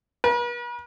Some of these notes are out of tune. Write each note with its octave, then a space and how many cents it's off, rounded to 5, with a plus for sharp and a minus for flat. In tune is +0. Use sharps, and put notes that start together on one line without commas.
B4 -45